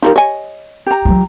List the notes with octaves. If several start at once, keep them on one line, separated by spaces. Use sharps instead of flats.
G3 A#3 D#4 F4 G4 A#4
C#5 D#5 G#5
G4 A#5
F#3 F4